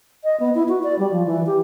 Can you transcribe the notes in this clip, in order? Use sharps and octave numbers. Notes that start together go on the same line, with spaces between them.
D#5
B3
E4
F#4
D5
G3
F3
E3
G4